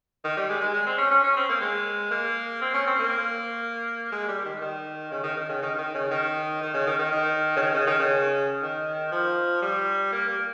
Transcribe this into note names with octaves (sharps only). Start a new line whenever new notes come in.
D#3
G3
G#3
G#3
G#3
C4
C#4
C#4
C#4
C4
A#3
G#3
A#3
C4
C#4
C4
A#3
G#3
G3
D#3
D#3
C#3
D#3
D#3
C#3
D#3
D#3
C#3
D#3
D#3
C#3
D#3
D#3
D#3
C#3
D#3
C#3
D#3
C#3
D#3
F3
G3
A#3
A#3